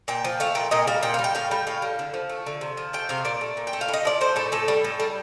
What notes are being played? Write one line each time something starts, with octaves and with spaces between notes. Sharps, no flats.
A#2 G5
F3
A3 F5
A#2 G5
A#2 D#5
G3 F5
A#2 G5
F5
G3
G5
A2 F5
G3 G5
A2 F5
G3
D3
F3
A3
D3
C3
F3
A3 G5
C3 F5
A#2 D5
A3
A#2
G5
A3
F5
A2
D#5
F3 D5
A3 C5
A2 A4
A2 A4
G3
A2
G3